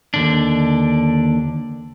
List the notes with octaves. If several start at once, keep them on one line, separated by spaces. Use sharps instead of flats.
D#2 D3 D4